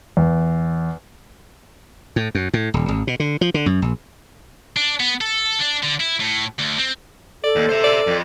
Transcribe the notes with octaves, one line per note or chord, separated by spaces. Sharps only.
E2
A2
F#2
A2
D#1
G#1
B2
D3
F3
D3
F#2
A#1
D4
B3
A4
D4
D3
E4
A2
D2
C4
A4 D5
D#2
C5 E5
D5
F2